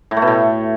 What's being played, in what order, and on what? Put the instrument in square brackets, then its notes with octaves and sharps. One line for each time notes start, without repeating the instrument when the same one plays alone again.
[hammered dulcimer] A2
A3
B2
A2